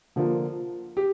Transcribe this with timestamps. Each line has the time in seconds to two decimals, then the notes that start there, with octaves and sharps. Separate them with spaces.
0.16 D3 F3 A#3
0.97 G4